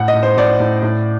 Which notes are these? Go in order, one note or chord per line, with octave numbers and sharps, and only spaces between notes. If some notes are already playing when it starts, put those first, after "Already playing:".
Already playing: A2 F#5
D#5
A2
C5
A2 D5
A2
A2